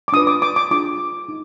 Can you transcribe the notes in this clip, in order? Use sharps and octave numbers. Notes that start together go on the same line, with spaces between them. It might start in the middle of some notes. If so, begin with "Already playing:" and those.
D6
D4 F4 B4 D#6
D6
D6
D6
D4 F4 G#4 D6
D#4